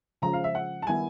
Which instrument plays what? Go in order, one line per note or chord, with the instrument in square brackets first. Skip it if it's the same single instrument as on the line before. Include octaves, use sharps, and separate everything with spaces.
[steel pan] C#3 F3 G#3 [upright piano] A#5
[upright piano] F5
E5
F#5
A5
[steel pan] D#3 G3 B3 E4 [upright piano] G#5